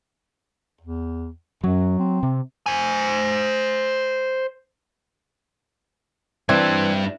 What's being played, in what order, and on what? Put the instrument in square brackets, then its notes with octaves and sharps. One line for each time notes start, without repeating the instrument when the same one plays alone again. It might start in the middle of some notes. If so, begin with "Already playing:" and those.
[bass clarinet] E2
[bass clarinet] F#2 [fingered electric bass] F#3
[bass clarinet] C4
[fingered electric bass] C3
[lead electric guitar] C5 G#5
[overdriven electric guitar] G2 D4 [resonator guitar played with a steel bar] E3 [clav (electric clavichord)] C4 [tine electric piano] D5 G#6